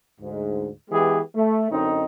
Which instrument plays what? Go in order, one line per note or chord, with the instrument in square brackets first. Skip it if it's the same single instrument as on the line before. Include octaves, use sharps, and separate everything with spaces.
[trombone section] D2 G#2
E3 G#3 B3 G4 G#4
A3
F#2 D3 C4 D#4